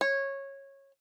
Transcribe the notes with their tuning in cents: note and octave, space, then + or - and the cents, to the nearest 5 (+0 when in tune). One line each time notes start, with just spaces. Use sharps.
C#5 -15